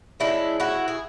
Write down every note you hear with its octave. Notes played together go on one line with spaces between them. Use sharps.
C#3 F3 G#3 D4 E4
E4 F#4
G#4